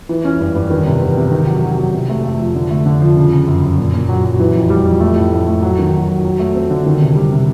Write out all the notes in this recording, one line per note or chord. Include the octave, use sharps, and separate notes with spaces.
E3
C#4
G2
G2
D#3
C3
E2
C3
D#3
F#3
F#3
F#3
C3
A3
A3
F3
D3
A3
D3
F3
C#3
C#3
F#2
F#2
A#2
A#2
F#3
F#3
E3
F2
G3
F2
A3
A2
A2
A3
F#3
D#3
F#3
F#3
F#3
A3
C4
D3
D#3
C3
G3
C3